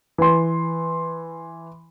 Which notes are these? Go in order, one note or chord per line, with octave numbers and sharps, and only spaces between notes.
E3 C6